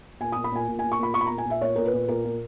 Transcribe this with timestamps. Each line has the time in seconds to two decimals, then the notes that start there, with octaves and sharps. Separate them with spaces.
0.21 A#2 G#5
0.32 A#2 D#6
0.44 B5
0.52 A#2 G#5
0.68 A#2
0.79 A#2 G#5
0.92 C#6
0.99 A#2 B5
1.14 A#2 C#6
1.21 B5
1.27 A#2 A#5
1.38 G#5
1.46 A#2 E5
1.61 A#2 C#5
1.76 A#2 A#4
1.85 B4
1.93 A#2
2.08 A#2 A#4
2.25 A#2